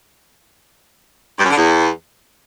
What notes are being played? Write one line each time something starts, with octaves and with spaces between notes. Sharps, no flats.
G2
F#2
D3
E2